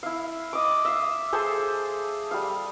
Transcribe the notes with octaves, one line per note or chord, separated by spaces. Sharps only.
E4 F5
D#5 D6
E5 F5
G#4 A4 C5
G3 F5